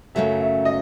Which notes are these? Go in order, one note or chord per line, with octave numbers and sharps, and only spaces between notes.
F#2 C#3 F#3 A3 E5
E5
D#5